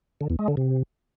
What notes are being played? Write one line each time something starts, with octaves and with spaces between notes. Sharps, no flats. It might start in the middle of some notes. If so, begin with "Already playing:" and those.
D3
E2
G#3
D3
C3